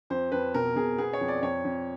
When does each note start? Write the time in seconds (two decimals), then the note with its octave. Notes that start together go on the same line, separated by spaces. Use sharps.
0.10 F2 C5
0.32 F2 B4
0.54 B2 A#4
0.76 B2 G#4
0.98 B3 G#4
1.13 C#5
1.21 F2
1.28 D5
1.42 F2 C#5
1.65 F2